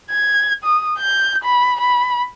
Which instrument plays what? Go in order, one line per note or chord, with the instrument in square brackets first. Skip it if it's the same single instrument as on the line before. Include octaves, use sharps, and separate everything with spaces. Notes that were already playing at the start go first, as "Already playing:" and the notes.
[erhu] G#6
D#6
G6
B5
B5